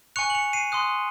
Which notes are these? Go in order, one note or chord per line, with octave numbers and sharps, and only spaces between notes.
G#5 C#6 F#6 C#7 F7
F#7
C#7 F7
C7 D#7
C6 D#6 F#6